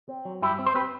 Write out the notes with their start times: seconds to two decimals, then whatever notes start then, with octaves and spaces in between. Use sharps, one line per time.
0.09 C4
0.25 F#3
0.42 G2 E4 G4
0.59 C4
0.66 C5
0.75 C4 G4 B4